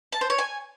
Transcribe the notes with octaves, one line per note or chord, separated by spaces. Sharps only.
A5
C5
C#5
G#5